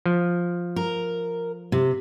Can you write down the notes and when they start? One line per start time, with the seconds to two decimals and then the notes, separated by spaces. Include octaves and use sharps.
0.06 F3
0.76 A#4
1.72 C3